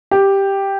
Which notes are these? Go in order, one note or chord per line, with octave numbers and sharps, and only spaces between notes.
G4